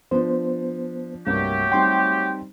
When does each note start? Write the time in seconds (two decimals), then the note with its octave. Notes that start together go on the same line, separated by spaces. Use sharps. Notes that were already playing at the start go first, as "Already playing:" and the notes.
0.11 F3 B3 D4 C5
1.27 C2 G2 F#3 A3 A#3 G4
1.72 G3 C4 D#4 G5 C6